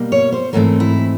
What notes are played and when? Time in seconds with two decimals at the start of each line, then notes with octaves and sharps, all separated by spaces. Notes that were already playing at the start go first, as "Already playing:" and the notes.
Already playing: B2 G3 A#3
0.12 C#5
0.32 C5
0.53 G#2 E3 A3 C4 A#4
0.80 E4